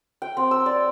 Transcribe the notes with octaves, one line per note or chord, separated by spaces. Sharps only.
G5
C4
E6
D5